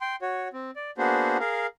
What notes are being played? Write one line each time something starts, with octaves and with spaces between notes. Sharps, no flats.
G5 C6
F#4 C#5
C4
D5
A#3 B3 D4 F#4 G#4 C5
G#4 A#4 F5